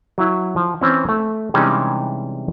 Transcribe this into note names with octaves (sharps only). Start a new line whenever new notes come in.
F#3 E4
F3
E3 C4 C#4
A3
C3 E3 G3 G#3 C#4 D#4